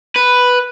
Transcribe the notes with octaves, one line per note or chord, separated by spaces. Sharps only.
B4